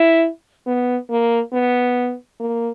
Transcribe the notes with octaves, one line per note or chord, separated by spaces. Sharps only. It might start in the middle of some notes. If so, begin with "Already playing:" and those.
Already playing: E4
B3
A#3
B3
A#3